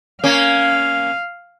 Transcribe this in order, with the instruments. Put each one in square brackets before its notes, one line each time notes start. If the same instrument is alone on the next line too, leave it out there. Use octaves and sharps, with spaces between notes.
[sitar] A#3 C#4 [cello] F5